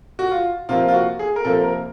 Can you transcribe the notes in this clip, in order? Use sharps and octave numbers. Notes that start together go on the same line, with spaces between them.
F#4
F4
C3 F3 A#3 F4
F4
F#4
G#4
A#4
C3 F3 A#3 A4
A#4